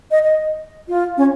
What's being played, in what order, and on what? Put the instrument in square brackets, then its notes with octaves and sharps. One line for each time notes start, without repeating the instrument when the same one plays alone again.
[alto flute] D#5
D#5
F4
C#4